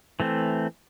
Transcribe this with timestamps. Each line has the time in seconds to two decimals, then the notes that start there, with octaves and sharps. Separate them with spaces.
0.20 E3 A3 C4